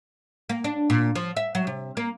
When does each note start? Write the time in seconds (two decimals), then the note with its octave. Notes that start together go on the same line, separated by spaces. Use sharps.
0.49 A#3
0.64 D4
0.90 A#2
1.15 F3
1.36 E5
1.55 F#3
1.67 C3
1.97 A#3